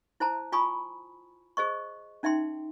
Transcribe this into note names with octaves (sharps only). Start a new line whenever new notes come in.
E4 C5 A5 A#5
F4 G#5 A5 B5 C#6 D#6
G#4 C5 D#5 C#6
C#4 D#4 E5 G5 C6